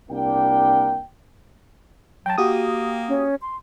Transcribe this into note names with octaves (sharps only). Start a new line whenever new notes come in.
C2 A#3 D4 G5
F#3 G5 A5
A#3 F#4 G4 D#6
C#4
C6